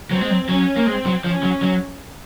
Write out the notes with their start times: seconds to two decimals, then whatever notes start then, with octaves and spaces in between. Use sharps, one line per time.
0.11 F#3 C4
0.21 G#3
0.30 F#3
0.49 F#3 C#4
0.77 A#3
0.87 G#3 C4
1.06 F#3
1.24 F3 C#4
1.43 F#3
1.62 F#3